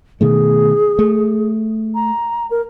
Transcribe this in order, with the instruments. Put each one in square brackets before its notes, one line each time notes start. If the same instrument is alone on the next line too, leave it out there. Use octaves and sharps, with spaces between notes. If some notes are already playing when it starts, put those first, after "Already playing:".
[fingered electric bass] B2 D#3 A3 [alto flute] G#4
[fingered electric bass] A3
[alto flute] A#5
A#4